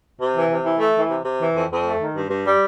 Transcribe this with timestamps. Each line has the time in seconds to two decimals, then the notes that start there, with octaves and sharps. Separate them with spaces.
0.20 C3
0.35 E3
0.50 C3
0.64 E3
0.80 A3
0.95 E3
1.09 C3
1.25 C3
1.40 E3
1.55 F2
1.71 F2
1.85 A3
2.00 D#3
2.15 G2
2.30 G2
2.46 G3